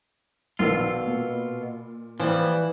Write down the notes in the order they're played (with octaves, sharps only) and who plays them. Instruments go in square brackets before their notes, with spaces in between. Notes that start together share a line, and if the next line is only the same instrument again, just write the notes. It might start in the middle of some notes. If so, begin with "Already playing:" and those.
[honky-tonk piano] A#1 D#3 E6 [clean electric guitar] B2 F4
[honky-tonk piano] A#2
[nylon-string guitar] E3 [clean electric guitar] F3 G3